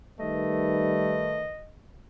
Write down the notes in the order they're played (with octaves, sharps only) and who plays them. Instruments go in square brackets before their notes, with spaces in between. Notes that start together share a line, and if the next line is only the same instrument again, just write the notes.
[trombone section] D#3 B4 [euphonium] G3 [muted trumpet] A3 [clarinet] D#5